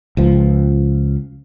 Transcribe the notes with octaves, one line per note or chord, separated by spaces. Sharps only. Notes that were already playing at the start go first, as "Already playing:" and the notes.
C#2 F3